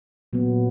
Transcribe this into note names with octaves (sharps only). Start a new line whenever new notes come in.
A#2 F#3 B3